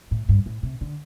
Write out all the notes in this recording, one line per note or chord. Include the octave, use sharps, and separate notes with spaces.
A2
G2
A2
C3
D3